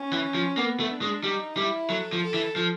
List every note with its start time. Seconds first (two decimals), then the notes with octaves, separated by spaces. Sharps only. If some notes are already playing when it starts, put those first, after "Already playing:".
Already playing: C#4
0.13 E3
0.35 F3
0.57 A#3 B3
0.80 A3
0.91 D4
1.02 G#3
1.23 G3 D#4
1.57 G3 E4
1.90 F#3 A4
2.13 F3
2.23 A4
2.34 E3
2.56 F3